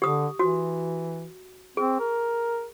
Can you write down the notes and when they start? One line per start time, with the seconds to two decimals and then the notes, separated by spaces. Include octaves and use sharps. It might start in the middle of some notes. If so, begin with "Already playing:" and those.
0.02 D3 G4 D#6
0.39 E3 F#4
1.77 C4 G#4
2.00 A#4